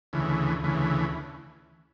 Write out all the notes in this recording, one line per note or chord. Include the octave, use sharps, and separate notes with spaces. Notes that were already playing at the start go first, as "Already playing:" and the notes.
D2 C#3 E3
D2 C#3 E3